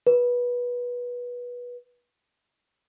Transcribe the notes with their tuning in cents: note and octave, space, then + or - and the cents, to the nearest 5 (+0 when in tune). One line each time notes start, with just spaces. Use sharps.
B4 -20